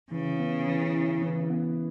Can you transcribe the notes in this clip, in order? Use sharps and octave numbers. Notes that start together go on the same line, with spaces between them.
C#3 E3
B3
E3
E4
E3
B3